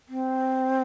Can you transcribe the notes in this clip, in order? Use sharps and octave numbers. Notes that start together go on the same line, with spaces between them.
C4